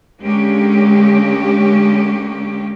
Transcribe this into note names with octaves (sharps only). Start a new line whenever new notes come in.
D3 G#3 A#3 C#4 G4